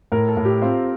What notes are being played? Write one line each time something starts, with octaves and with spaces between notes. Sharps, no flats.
A2 A#4
A4
A2
G4
C4 F4